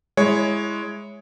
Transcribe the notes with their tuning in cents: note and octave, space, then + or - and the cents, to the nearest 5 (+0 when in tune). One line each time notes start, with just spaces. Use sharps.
G#3 +0 E4 +0 C#5 +0